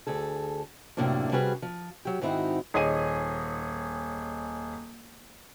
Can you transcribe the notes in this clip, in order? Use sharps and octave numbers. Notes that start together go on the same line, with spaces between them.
D2 G#4 A4
F#2 A2 C3 A#3 C#4 D4
C3 G3 C#4 F#4 G#4 B4
F3
F#3 G4
G#2 D#3 C4 D#4 E4 F#4
D#1 G#4 C#5 D#5 G#5 D#7